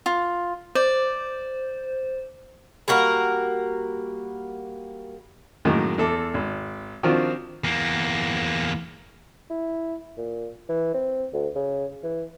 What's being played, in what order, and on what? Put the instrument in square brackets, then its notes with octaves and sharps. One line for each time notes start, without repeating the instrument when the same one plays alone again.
[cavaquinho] F4
[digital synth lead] C5 [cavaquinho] D5
[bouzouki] G3 A#3 F#4 A#4
[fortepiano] F#2 A2 D#3 G#3 A#3
E2 A4 D6
G#1
D#3 F3 C4 D4 F4 F#4
[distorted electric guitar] E2 A#3
[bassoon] E4
A#2
E3
C4
D2
C#3
E3